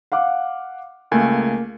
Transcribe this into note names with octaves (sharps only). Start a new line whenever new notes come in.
F5 F#5 D6
C#2 A3 A#3 G#5